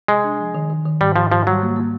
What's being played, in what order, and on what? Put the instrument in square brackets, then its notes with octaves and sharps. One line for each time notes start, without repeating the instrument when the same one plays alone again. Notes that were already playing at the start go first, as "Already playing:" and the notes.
[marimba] C3 [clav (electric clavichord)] G#3
[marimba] D4
F3
D#3
D#3
D#3
[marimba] G#2 [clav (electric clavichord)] G3
[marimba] G#2 [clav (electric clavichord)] F3
[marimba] G#2 [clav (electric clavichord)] F3
[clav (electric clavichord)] F#3 [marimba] G3
[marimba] A#3
A#3